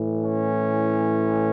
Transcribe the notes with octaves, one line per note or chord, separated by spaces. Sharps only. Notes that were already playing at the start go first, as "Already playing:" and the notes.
Already playing: A2 E3
C#4